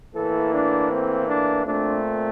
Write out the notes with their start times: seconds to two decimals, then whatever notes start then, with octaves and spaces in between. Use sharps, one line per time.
0.14 A2 E3 A#3 A4
0.52 D4
0.90 C4
1.28 D4
1.65 A#2 A3 C4 D4